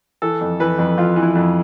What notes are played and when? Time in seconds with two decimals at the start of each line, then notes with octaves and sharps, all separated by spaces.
0.22 E3 A4
0.41 F2
0.60 E3 B4
0.78 F2
0.97 F2 F4
1.16 E3
1.23 E4
1.35 F2